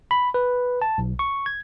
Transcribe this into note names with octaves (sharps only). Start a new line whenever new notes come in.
B5
B4
A5
B1
C#6
G#6